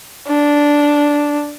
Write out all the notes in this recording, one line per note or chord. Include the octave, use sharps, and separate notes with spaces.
D4